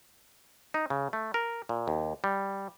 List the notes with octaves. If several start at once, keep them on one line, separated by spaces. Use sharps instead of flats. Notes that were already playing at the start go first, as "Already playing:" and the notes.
D#4
C#3
A3
A#4
A#2
D#2
G3